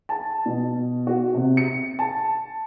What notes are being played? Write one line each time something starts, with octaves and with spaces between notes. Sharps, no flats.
A5
B2
F#4
C3
C#7
A5